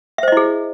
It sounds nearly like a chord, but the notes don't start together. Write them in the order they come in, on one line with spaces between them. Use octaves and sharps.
E5 C5 D#5 E4 G#4